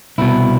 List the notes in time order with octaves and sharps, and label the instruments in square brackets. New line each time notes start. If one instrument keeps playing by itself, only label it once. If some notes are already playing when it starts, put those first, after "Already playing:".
[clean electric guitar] C2 B2 E4